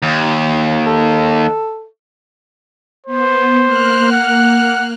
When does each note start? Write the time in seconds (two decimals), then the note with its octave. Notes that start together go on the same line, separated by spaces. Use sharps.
0.03 D#2
0.86 A4
3.06 B3 C5
3.65 A#3 F6 F#6
4.12 F#5